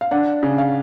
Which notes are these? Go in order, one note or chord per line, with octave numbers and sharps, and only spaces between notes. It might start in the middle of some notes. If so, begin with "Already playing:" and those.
F5
D4 F#5
C#3
F5